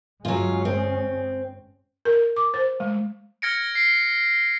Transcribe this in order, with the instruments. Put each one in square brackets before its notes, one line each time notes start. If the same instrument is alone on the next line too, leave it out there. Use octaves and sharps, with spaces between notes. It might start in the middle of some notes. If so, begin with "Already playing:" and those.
[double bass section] G1 G#3 C#4 [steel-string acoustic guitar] F#3 F4
[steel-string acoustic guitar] C4
[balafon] A#4
D6
C5
G#3
[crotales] F6 G#6 A#6 C#7 D7
C7 D7